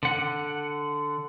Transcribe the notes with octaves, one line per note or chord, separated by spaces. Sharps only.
D3 F#5